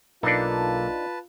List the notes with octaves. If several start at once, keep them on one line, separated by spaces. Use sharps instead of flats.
B1 A#3 D4 D#4 F4 A4 B4 A5